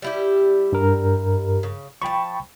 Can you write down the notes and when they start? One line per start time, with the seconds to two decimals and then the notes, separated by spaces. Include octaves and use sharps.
0.02 G3 E4 G4
0.72 G2 A#4
1.63 C#3
2.02 F3 G5 A5 B5 C#6